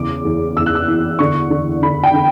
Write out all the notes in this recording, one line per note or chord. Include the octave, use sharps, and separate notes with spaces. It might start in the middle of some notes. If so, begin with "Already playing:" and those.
Already playing: E2 C#3 D6
E2
E2 E6
F#6
E6
E3
D3 C#6
D3
D3 B5
G5
D3